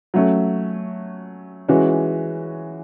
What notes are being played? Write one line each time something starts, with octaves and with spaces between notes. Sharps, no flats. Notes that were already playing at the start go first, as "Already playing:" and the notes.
F#3 A3 C#4
E3 G#3 C#4 F#4